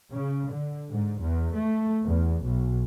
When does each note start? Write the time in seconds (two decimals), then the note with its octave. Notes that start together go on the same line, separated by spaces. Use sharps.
0.10 C#3
0.50 D3
0.90 G#2
1.22 E2
1.54 A3
2.03 E2
2.43 B1